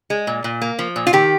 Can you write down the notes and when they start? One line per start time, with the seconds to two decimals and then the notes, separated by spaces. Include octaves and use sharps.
0.10 G#3
0.27 A#2
0.44 A#2
0.62 A#3
0.79 F3
0.96 A#2
1.07 F4
1.13 D#3 G4